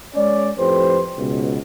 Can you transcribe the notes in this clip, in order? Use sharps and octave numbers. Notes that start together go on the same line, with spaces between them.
G#3 C#4 C#5 D5
F2 A2 G4 B4 C5
C#2 B2